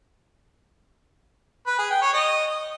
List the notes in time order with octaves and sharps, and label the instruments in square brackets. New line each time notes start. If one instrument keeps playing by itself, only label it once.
[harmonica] B4
G#4
G5
C#5
D#5